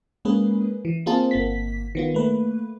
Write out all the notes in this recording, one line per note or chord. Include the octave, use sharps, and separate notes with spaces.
G#3 A#3 C#4 G#4 B4
E3
A#3 C4 F4 G#4 A5
G1 A#3 B6
D#3 B3 F4
A3 A#3 B4